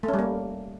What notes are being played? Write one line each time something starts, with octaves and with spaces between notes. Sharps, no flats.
A3
C#4
G3
A#3